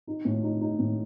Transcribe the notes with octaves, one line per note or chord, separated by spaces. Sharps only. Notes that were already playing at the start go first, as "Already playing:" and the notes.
D#4
A2
D#4
D#4
A2